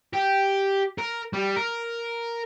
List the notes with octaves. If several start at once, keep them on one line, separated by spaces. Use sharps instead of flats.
G4
A#4
G3
A#4